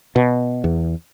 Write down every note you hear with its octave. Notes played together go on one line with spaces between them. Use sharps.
B2
E2